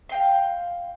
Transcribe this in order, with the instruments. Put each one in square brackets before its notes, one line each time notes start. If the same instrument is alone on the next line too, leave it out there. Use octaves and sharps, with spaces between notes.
[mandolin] F5 G5 C6